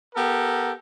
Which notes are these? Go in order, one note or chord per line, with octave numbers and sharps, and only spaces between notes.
B3 G4 A4 A#4